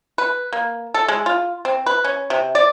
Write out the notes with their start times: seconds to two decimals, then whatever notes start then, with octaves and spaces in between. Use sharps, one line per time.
0.18 B4
0.53 A#3
0.94 A4
1.08 G#3
1.26 F4
1.65 C4
1.86 B4
2.04 C#4
2.30 C3
2.55 D5